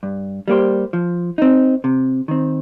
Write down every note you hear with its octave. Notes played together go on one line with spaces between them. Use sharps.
G2
G3 A#3 G4 C5
F3
C4 D#4
C3
D#3 C4